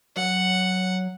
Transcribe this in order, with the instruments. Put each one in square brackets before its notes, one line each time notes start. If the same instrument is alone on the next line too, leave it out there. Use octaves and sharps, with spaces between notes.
[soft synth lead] F#3 [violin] F#5